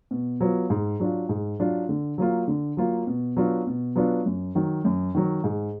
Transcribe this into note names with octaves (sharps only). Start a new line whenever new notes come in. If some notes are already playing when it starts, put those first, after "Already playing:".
B2
F#3 B3 F4
G#2
F#3 D4 F4
G#2
F#3 D4 F4
D3
F#3 A#3 F4
D3
F#3 A#3 F4
B2
F#3 B3 D4 F4
B2
F#3 B3 D4 F4
F#2
D#3 F#3
F#2
D#3 F#3
G#2